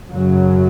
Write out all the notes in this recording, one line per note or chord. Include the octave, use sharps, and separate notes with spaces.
F#2 C#3 F#3